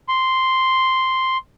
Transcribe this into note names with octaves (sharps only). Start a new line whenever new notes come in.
C6